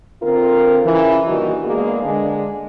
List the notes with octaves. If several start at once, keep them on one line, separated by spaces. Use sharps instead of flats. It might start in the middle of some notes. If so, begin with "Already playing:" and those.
D3 C4 F4 A#4
C#3 E3
A#2 D#3 G3 D4 D#4 F#4
G#3 A#3 B3 D4 G#4
D3 G#3 D4